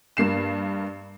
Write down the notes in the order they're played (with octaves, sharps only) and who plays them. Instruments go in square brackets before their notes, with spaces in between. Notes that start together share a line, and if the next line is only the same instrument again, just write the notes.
[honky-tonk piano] G2 A#3 C7 E7